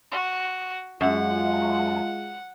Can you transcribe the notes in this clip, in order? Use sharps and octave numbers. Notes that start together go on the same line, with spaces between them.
F#4
F#2 G#3 F4 F#5